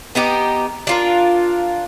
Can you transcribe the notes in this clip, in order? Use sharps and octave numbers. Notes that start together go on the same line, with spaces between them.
B3 D#4 G4
D4 F4 A#4